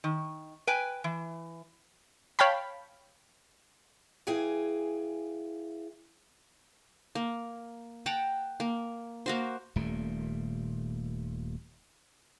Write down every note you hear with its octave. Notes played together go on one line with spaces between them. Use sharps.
D#3
B4 G5 G#5
E3
C#5 F5 G5 A5 B5
E3 G#4 F5 G5 G#5
A#3
F#5 G5 A5 A#5
A#3
A#3 F#4 C5
D#1 D#2 A#2 A3